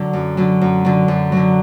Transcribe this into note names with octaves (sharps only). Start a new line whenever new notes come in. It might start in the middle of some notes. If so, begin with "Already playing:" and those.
Already playing: D3 F#3
F#2
D3 F#3
F#2
D3 F#3
F#2
D3 F#3